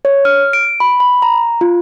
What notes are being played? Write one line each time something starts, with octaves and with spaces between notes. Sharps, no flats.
C#5
F6
D7
B5
B5
A#5
F4